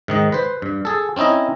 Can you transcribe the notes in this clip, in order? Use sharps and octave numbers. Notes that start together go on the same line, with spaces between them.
G#2 D#3 D#5
B4 C5
G2
G#4 A4
C4 C#4 D#4 E4 D#5